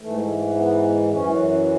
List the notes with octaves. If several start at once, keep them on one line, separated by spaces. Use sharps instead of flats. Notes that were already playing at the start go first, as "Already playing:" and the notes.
G#2 E3 A3
B3
F#2 E3 C#4